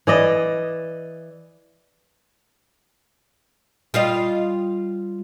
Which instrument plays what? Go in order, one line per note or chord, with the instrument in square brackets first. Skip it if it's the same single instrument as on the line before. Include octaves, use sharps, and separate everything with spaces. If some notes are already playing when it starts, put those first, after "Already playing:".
[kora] E3 D5 D#5
[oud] G3 F4 D#5